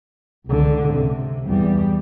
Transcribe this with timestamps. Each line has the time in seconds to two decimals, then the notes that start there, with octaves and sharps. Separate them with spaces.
0.46 C#2 D3
0.94 C3
1.46 E2 G3